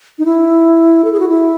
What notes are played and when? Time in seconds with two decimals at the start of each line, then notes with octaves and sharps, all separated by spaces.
0.19 D#4
0.25 E4
1.04 A4
1.13 G#4
1.20 F#4
1.29 E4